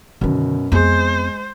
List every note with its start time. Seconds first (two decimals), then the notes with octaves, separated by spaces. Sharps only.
0.21 F#2 B2 D3 D#3
0.72 F2 G#3 B3 G#4 C5